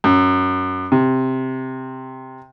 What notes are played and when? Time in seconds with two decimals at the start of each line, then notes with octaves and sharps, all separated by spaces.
0.04 F#2
0.92 C3